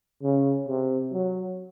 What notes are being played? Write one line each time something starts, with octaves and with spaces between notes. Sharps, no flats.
C#3
C3
F#3